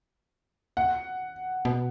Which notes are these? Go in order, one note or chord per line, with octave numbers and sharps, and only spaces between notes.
F#5
B2